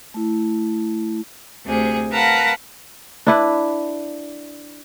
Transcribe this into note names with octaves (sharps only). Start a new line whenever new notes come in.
A3 E4
D2 C3 G#4
A#4 B4 F5 F#5 A5 A#5
D4 E4 B4